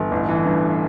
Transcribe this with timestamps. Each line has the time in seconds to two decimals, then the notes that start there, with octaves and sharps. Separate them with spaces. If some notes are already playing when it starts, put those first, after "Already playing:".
Already playing: G1
0.11 A1
0.28 E3
0.46 G2